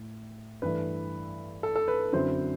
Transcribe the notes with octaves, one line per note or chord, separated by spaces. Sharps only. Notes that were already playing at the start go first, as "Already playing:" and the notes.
Already playing: A2
G2 E3 A3 B4
A4
A4
B4
F#2 D3 F#3 C4 E4 C5